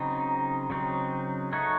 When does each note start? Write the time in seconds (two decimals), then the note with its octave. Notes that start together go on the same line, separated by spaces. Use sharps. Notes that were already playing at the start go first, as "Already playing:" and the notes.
Already playing: C#3 F#3 C4 D#4
0.70 C#3 F#3 C4 D#4
1.53 A3 D#4 F#4 C#5